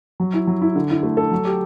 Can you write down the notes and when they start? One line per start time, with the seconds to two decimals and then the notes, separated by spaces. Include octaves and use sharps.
0.20 F#3
0.34 E4
0.47 F#3
0.62 E4
0.76 D3
0.90 E4
1.03 A3
1.17 A4
1.32 F#3
1.45 G4